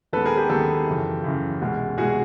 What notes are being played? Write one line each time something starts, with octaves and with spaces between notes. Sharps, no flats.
D#2 D#3 G#3 B3 A4 B4
G#4 A#4
G4 A4
D#2 D#3 G#3 B3 G4 A4
F#2 C#3 E3
F#2 C#3 E3
C2 B2 G#3
C2 B2 G#3 F#4 G#4